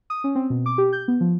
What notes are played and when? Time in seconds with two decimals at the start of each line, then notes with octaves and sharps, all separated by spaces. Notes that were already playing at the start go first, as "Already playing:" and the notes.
0.10 D#6
0.24 C#4
0.35 C4
0.50 B2
0.66 D6
0.78 G4
0.93 G6
1.08 B3
1.21 F3